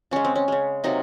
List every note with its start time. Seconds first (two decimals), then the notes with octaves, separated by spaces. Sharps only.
0.11 C#3 G#3 C#4
0.25 C4
0.35 C#4
0.48 C#3 G#3
0.84 C3 F#3 A#3 D#4